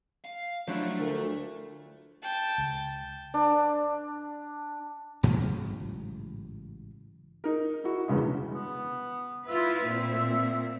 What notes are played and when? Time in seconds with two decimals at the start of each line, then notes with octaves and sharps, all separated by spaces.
0.24 F5
0.68 F3 F#3 A3 D4 E4
0.99 D2 A#4
2.22 G5 A5
2.58 C#2
3.34 D4
5.23 A1 G#2 C#3 F#3
7.44 D#4 A#4
7.84 E4 F#4
8.08 E2 G2 C#3 G#3
8.54 B3
9.48 E4 F4 B4 E5
9.85 A#2 C4